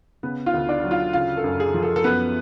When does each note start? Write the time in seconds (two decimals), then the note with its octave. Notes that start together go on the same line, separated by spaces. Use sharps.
0.23 C#3 B3 B4
0.46 F4 F5
0.54 D2
0.69 D4 D5
0.84 F#3
0.91 F4 F5
1.13 C#3 F4 F5
1.37 A4
1.44 F#2
1.60 G#4
1.74 F3
1.83 A4
1.96 A4
2.04 F#2 B3 B4